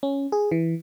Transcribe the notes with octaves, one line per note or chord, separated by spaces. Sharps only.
C#4
G#4
E3